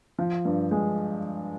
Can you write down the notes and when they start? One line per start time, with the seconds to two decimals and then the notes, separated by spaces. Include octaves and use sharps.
0.19 F3
0.45 G2
0.71 G#3